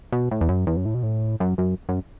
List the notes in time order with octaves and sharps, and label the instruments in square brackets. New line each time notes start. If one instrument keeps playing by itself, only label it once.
[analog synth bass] B2
A2
E2
F#2
E2
F#2
A2
B2
A2
F#2
F#2
F#2